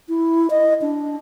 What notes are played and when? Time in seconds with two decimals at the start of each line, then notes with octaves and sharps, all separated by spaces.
0.09 E4
0.50 D#5
0.82 D4